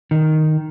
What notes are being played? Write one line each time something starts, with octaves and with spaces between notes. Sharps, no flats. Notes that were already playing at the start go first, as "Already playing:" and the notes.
D#3